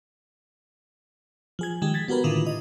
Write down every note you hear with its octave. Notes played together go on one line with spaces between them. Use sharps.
F3 G#4 G#6
D#3 G#3 G4
G#6 A6 B6
B3 F#4 G4 A#4 B4
A2 D3 D#3 E4 F4
D#5